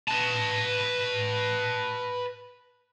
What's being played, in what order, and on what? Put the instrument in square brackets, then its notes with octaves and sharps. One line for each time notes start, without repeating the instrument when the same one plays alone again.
[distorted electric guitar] B4 A5